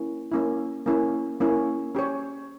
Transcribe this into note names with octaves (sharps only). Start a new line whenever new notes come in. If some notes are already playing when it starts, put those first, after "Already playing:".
Already playing: A#3 C#4 E4
A#3 C#4 E4
A#3 C#4 E4
A#3 C#4 E4
C#4 G4 C#5